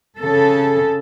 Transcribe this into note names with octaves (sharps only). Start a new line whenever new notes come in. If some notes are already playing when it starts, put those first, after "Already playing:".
C#3 A4